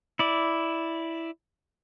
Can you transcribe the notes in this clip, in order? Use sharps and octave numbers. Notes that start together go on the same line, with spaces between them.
E4 D5